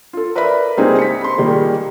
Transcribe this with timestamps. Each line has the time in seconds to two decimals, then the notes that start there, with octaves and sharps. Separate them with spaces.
0.13 F4 A4
0.36 A#4 B4 D5 E5 B5
0.77 C#2 G3 A#3 C4 D#4 G#4
0.99 B6 C#7
1.21 B5 C6
1.38 A#2 D#3 G3 G#3 A#3